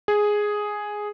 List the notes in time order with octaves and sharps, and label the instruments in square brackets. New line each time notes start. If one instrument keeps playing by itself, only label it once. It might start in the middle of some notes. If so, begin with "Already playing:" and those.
[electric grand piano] G#4